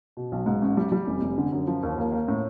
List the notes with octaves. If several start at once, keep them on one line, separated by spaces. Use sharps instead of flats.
B2
B1
G#2
A1
G3
G3
F1
F1
D3
F#2
F3
D#2
A#3
A#3
A2